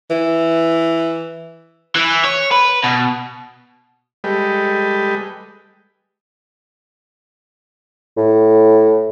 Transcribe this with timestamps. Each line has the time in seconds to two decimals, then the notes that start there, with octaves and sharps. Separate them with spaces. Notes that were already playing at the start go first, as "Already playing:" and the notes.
0.11 E3
1.95 E3
2.24 C#5
2.52 B4
2.84 B2
4.24 G3 G#3 G4 A4 B4 D#5
8.17 A2